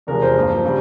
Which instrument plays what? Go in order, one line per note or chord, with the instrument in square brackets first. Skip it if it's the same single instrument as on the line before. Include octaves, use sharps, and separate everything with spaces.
[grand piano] E2 C3 F3 G#3 A#4
C5
G2 F3 A#3
C#3 G3